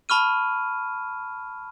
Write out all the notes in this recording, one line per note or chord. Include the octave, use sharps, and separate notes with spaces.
A5 B5 C#6 F6 D#7